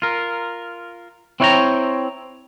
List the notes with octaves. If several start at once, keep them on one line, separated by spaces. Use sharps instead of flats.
F4 A#4
C4 E4 C#5 F5 G5 A#5